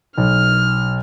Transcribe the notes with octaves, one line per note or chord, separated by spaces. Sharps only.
B1 F6